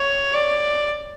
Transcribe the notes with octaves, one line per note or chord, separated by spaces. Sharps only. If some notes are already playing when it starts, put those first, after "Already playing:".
Already playing: C#5
D5